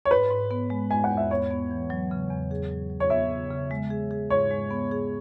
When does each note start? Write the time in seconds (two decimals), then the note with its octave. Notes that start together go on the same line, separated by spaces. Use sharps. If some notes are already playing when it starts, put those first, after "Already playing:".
0.05 C#5
0.10 G#2 B4
0.30 G#2
0.51 B3
0.70 G#3
0.90 G#3 G#5
1.04 F#5
1.10 E2
1.17 E5
1.31 B3 C#5
1.51 B3
1.71 E3
1.90 F#3
2.11 C#3
2.30 E2
2.51 G#4
2.71 F#3
2.90 F#3
3.00 C#5
3.10 B3 E5
3.31 C#3
3.51 C#3
3.71 G#3
3.90 G#4
4.11 G#4
4.30 G#2 C#5
4.51 G#3
4.70 B3
4.91 G#4